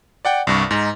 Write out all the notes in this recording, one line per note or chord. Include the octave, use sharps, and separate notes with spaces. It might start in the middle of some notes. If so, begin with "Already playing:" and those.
D5 F#5 G5
C2 G2 C#6
G#2 D#4